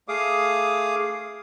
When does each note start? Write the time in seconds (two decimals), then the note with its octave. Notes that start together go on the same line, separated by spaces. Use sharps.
0.08 A3 G#4 F5 D6 D#6